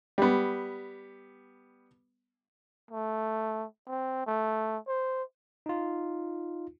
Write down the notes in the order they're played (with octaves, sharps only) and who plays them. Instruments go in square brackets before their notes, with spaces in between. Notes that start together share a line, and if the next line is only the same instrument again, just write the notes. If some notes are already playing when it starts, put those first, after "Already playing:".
[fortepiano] G3 B3
[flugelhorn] A3
C4
A3
C5
[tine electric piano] D#4 F4